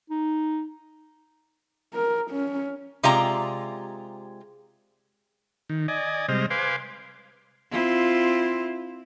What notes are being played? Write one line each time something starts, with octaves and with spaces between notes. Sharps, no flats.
D#4
A#4
C#4
C3 G#3 F4 G4 D5 A#5
D#3
D5 D#5 G#5
C3 G3 G#3 C5 D#5 F6
B4 C5 F5 G#5 C6 D6
C4 E4 F4